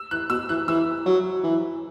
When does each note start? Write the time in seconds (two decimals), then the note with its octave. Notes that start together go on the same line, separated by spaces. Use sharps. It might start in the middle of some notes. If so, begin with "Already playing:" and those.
Already playing: E6
0.11 E3 F#6
0.30 B2 E6
0.49 E3 F#6
0.68 E3 E6
1.06 F#3
1.44 E3